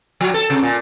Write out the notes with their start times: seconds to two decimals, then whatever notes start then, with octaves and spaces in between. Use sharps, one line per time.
0.21 F3
0.34 A4
0.50 C3
0.63 A#2